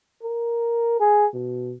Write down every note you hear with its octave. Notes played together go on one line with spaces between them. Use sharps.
A#4
G#4
B2